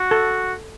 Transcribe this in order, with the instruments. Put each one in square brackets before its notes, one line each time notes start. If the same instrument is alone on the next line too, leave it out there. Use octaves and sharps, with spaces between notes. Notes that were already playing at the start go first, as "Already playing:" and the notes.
Already playing: [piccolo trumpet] F#4
[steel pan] A4